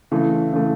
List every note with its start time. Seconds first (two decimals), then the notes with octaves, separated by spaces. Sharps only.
0.11 C#3 E3 A3
0.53 C#3 E3 A3